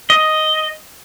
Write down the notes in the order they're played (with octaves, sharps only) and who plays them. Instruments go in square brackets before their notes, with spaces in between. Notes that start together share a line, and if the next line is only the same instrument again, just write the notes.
[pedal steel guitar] D#5